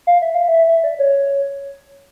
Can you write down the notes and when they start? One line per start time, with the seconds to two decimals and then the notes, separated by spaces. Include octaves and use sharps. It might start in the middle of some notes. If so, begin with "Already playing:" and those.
0.07 F5
0.22 E5
0.35 F5
0.48 E5
0.68 E5
0.84 D5
0.99 C#5